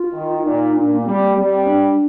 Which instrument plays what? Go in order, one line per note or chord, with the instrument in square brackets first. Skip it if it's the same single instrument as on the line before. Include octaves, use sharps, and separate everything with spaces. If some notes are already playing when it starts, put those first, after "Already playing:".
Already playing: [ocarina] F4
[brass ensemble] D#3
[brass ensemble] A#2 [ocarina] D#4
[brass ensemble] A#2 [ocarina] D4
[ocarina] A#3
[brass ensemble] G3 [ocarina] C4
[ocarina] A#3
[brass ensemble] G3 [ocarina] C4
[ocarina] D4